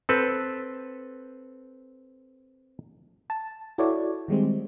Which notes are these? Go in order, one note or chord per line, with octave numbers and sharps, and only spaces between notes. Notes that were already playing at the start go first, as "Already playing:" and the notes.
C4 A4 B4
A5
E4 F#4 A4 C#5 D5
D#3 G3 G#3 C4